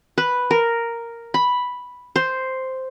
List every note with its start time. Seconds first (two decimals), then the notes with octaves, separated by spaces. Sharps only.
0.18 B4
0.51 A#4
1.34 B5
2.16 C5